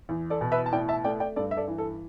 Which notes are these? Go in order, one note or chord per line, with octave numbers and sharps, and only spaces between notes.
E2
A4 D5
B2
B4 E5
A5
A2 D5 G5
E5 A5
A3 D5 G5
D5 G5
G2 A4 D5
E5
A4 D5
E3
A4